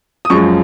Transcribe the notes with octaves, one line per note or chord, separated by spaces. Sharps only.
D#6
F#2 F3 G#3 C#6